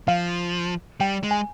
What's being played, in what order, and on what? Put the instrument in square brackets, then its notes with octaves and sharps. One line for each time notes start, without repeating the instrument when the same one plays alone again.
[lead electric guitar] F3 [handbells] F5
[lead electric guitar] G3 [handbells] G5
[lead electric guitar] G#3
[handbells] G#5